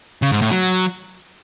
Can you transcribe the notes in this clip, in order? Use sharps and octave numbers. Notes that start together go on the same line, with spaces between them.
C#3
G#2
A2
F#3